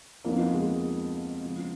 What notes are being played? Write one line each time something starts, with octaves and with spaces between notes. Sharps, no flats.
F2 F3 A#3 B3 D#4
G#3
C#3 F3 B3